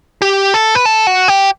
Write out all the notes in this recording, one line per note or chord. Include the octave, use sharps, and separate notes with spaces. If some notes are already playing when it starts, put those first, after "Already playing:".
G4
A4
B4
A4
F#4
G4